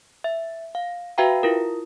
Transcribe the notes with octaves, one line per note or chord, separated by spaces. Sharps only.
E5
F5
F#4 B4 E5 F5 G5 A#5
E4 F4 A#4